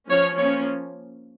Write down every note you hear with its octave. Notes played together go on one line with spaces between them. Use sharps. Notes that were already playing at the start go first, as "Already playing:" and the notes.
F3 C#4 C#5
F3 A#3 C#4 C#5